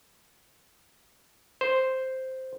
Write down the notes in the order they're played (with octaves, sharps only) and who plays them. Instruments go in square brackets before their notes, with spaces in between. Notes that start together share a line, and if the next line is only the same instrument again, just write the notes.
[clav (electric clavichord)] C5